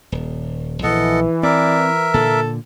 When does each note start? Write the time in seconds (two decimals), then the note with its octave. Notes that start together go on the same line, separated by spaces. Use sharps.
0.12 D#1
0.83 A#1 E3 A4 D#5 F#5
1.43 C4 A#4 D5 E5
2.14 A#2 D3 A4